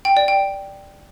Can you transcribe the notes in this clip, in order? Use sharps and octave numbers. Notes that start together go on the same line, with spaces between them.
G5
D5
G5